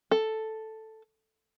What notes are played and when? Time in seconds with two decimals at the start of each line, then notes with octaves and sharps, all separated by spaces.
0.11 A4